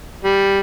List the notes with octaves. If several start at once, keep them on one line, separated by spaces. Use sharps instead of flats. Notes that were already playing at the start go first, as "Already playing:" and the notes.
G3